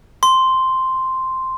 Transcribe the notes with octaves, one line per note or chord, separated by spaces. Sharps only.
C6